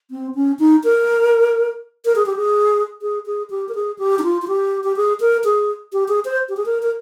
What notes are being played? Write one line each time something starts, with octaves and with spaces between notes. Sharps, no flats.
C4
C#4
D#4
A#4
A#4
G#4
G4
G#4
G#4
G#4
G4
A#4
G#4
G4
D#4
F4
F4
G4
G4
G#4
A#4
G#4
G4
G#4
C5
G4
G#4
A#4
A#4